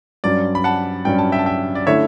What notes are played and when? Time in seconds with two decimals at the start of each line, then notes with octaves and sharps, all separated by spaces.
0.24 G2 F#3 C#4 D5
0.55 B5
0.64 F#5 A5
1.05 G2 F#3 C#4 G5
1.18 A5
1.32 E5 G5
1.39 A5
1.46 E5 G5
1.75 D5
1.87 D3 A3 C#4 E4 C#5 E5